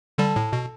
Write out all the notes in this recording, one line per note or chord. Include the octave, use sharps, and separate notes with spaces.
D3 G3 A4
A2
B2